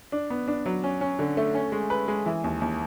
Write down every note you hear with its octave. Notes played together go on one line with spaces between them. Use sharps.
D4
B3
D4
F#3
C#4
C#4
D3
A3
C#4
G#3
B4
G#3
E3
D#2
D#2